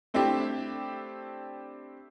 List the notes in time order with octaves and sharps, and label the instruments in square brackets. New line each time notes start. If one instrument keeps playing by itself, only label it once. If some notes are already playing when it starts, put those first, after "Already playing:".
[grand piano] A3 C4 D4 E4 G4